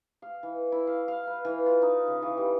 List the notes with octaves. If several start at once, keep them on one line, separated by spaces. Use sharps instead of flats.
F5
E3
E4
F5
F5
B4
E3
F4
D#4
C#3
E3
G3